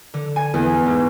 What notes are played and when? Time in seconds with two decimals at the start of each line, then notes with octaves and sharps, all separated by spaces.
0.14 D3
0.36 G#5
0.54 E2
0.86 G#2